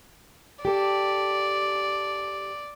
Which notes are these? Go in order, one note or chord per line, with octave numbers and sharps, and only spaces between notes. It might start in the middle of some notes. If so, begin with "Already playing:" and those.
G4 A4 D5